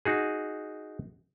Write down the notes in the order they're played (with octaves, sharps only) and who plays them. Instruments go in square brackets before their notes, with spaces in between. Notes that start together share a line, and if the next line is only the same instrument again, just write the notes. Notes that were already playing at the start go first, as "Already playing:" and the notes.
[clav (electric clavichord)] D#4 F#4 G#4